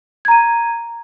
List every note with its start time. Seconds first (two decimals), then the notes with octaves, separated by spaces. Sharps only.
0.25 G#6
0.28 A#5
0.31 D#7